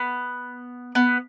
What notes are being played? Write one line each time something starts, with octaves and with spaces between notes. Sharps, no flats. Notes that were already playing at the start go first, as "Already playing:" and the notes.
Already playing: B3
B3